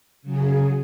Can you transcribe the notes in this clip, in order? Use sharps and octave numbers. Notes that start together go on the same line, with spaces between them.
C#3 F#3 G#4